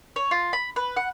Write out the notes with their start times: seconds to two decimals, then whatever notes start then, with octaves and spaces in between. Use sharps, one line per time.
0.16 C#5
0.31 F4
0.53 B5
0.76 B4
0.97 F#5